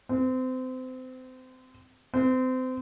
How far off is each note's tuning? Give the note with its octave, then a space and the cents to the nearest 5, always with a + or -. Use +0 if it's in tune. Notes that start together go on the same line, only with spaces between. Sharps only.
C4 -30
C4 -30